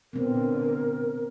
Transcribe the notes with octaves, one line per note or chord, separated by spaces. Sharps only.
G1 A#2 D3 B3 C4 A#4